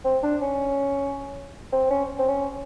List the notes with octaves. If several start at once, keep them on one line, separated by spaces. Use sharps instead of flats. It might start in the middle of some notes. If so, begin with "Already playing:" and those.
C4
D4
C#4
C4
C#4
C4
C#4